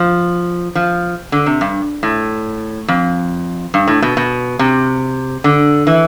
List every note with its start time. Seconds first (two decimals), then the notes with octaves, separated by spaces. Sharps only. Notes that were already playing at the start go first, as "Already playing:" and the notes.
Already playing: F3
0.75 F3
1.32 D3
1.46 C3
1.61 G2
2.03 A2
2.88 F2
3.74 G2
3.88 A2
4.02 B2
4.17 B2
4.59 C3
5.44 D3
5.87 E3